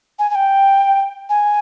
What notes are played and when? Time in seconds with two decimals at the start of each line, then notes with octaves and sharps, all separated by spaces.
0.19 G#5
0.30 G#5
0.35 G5
1.29 G#5